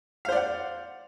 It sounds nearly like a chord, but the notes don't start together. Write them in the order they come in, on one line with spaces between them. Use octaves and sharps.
F5 C5 D5 F#5